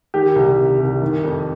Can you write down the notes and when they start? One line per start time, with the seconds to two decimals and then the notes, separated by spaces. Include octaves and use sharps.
0.14 D#3 G4
0.36 C2
0.58 C3
0.80 C2
1.02 D#3
1.24 F2